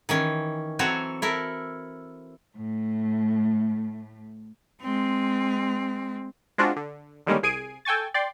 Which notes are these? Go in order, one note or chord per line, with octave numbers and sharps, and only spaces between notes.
D#3 E3 C#4
E3 F#3 C4 F#4 A4 C#5
E4 A4 A#4
A2 A3
G#3 C4
G#3 C4 D4 F4 F#4
D3
D3 D#3 G3 G#3 A#3 C#4
C2 G#4 G#5 C7 D7 D#7
A4 G5 G#5 C#6 A6
D5 G5 C6